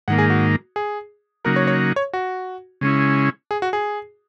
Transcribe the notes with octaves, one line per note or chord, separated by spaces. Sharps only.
G#2 D#3 A#3 F#5
G#4
F#4
G#4
C#3 F#3 A#3 D#4 F#4 A#4
C#5
C#5
C#5
F#4
C#3 G#3 C#4 E4
G#4
F#4
G#4